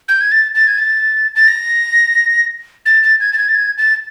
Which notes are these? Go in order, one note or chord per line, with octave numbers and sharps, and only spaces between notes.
G6
G#6
A6
A6
G#6
A6
A6
A#6
A6
A6
G#6
A6
G#6
A6
G#6
A6